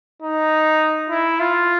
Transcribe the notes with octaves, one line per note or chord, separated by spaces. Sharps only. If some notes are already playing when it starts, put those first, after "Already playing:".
D#4
E4
F4